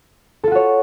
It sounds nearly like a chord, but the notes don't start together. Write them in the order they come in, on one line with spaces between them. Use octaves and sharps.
A4 F4 F#4 C#5